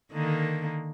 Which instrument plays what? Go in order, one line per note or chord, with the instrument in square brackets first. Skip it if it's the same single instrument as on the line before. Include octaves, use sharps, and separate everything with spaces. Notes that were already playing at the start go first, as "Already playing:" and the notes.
[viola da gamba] D3 D#3 A#3